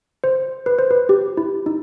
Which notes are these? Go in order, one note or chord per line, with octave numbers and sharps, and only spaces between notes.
C5
B4
C5
B4
G4
E4
D#4